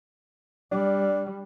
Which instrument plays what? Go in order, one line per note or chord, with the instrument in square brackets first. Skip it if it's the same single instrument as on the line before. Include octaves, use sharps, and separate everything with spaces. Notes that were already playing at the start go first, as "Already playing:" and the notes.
[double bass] G3 [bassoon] D4